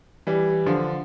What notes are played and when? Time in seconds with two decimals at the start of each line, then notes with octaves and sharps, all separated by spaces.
0.27 E3 G3
0.66 D3 F3